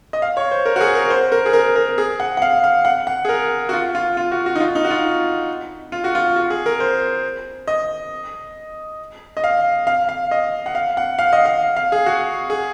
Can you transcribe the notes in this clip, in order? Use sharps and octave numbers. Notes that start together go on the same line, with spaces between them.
D#5
F5
C#5
C5
A#4
F#4
G#4
A#4
C5
A#4
G#4
A#4
A#4
G#4
F#5
F#5
F5
F5
F#5
F#5
G#4
A#4
F#4
F4
F4
F4
F#4
F#4
D#4
F4
D#4
F#4
F4
F4
F#4
F4
F#4
G#4
A#4
C5
D#5
D#5
F5
F5
F5
D#5
F#5
F5
F#5
F5
D#5
F5
F5
G#4
F#4
G#4